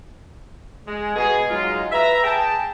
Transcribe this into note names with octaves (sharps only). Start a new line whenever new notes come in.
G#3
B2 G#4
F#3 G#3 D#4 F4
B4 E5 A#5
G#4 G5 A5